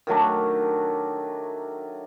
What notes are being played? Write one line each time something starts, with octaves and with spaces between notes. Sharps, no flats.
D#3 F#3 A3 D4